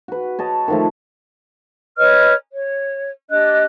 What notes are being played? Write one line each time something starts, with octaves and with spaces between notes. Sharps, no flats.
F#4 B4
C#5 D#5 A5
D#3 F3 A3
B4 C#5 D#5 F6
C#5
D4 G4 D#5 F#6